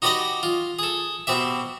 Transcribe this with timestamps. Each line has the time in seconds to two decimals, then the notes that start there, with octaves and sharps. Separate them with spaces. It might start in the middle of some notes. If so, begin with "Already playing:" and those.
0.02 D#4 F#4 G4 B4 D5 D#5
0.43 F4
0.79 G#4 A4
1.27 B2 C4 G4 E5